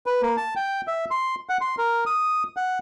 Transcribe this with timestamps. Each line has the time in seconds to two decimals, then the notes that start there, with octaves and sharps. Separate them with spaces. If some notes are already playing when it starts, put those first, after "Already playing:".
0.06 B4
0.22 A#3
0.37 A5
0.56 G5
0.87 E5
1.11 C6
1.49 F#5
1.61 C6
1.78 A#4
2.06 D#6
2.57 F#5